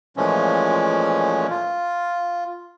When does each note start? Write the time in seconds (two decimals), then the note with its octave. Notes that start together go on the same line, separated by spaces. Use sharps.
0.17 A#2 E3 F3 G#3 A3 C#4
1.50 F4